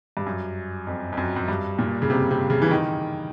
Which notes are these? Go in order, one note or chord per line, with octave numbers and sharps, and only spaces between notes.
G2
F#2
F2
F2
F#2
F#2
G2
A#2
C#3
C3
C3
C#3
E3
D#3